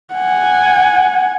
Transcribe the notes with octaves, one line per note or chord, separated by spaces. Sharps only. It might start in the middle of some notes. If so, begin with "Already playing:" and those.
F#5 G#5